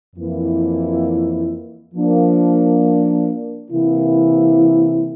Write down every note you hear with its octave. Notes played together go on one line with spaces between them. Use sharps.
F2 E3 A#3 E4
F3 A#3 D4
C3 E3 A#3 E4